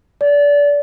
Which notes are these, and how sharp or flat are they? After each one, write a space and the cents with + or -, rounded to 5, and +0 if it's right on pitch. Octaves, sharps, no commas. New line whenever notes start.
D5 -25